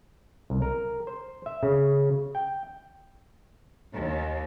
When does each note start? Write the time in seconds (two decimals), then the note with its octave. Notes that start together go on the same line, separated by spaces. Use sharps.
0.50 C2
0.62 A#4
1.07 C5
1.46 E5
1.63 C#3
2.35 G5
3.91 D#2